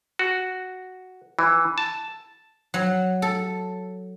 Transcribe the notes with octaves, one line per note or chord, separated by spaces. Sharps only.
F#4
E3
A5
F#3
A4